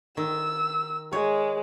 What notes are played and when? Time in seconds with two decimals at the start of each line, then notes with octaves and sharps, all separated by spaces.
0.17 D#3 E6
1.12 G#3 C#5